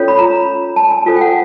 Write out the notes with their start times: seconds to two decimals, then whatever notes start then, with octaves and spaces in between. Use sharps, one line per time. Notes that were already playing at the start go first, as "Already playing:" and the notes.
Already playing: C#4 F4 A4 C#5
0.08 B5
0.19 A#5
0.76 A5
0.91 G#5
1.06 F4 A4 C5 G#5
1.16 G5
1.21 F#5